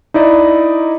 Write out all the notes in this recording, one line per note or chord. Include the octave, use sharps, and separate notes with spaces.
D#4 E4 D5 D#5